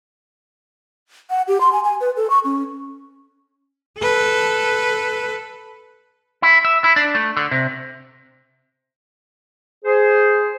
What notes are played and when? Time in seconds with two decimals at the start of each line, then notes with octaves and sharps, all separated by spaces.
1.30 F#5
1.48 G4
1.61 C6
1.73 G#5
1.84 G#5
2.01 B4
2.16 A4
2.30 C#6
2.45 C#4
4.00 A4 B4
6.42 E4
6.65 E5
6.84 E4
6.96 D4
7.15 A3
7.37 D3
7.51 C3
9.85 G#4 C5